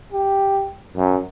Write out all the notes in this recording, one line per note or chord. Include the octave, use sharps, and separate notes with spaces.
G4
F#2